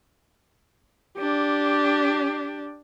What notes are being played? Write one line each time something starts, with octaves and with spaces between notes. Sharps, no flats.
D4 G4